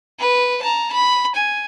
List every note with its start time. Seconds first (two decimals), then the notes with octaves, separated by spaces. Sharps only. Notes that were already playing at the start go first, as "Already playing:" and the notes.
0.19 B4
0.62 A5 A#5
0.92 B5
1.35 G#5